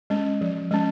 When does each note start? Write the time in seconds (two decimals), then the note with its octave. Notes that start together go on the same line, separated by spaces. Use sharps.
0.10 G#3 C#4
0.41 F3
0.71 G#3 C#4